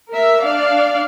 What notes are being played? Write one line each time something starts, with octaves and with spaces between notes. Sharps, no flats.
A#4 E5
D4 D5 F5